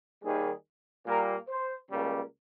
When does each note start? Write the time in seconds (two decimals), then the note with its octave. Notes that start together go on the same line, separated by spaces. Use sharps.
0.22 D#2 D#3 G3 G#4
1.06 A#2 G3 A#3 A#4
1.48 C5
1.90 C#2 C#3 G3 A#3